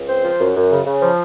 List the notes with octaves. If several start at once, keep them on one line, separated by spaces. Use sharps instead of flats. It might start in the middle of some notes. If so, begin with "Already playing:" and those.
Already playing: C#2
C4 C5
F3
F#2
F#2
C#3
C#3
F3